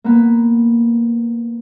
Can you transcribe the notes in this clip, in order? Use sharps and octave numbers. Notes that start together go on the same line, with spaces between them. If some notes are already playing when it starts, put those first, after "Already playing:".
A#3 B3